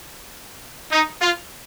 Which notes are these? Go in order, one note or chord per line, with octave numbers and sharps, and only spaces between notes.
D#4
F4